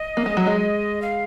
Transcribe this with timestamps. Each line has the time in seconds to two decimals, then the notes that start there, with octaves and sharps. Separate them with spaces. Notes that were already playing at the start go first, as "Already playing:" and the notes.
Already playing: D#5
0.17 A#3
0.26 G#3
0.37 F#3
0.46 G#3
1.02 F5